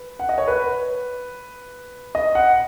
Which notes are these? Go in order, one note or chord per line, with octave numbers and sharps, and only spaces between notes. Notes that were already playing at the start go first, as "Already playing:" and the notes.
Already playing: B4
F#5
D#5
C#5
B4
D#5
F#5